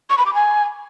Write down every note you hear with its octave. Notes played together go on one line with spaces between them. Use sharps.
C#6
B5
D6
G#5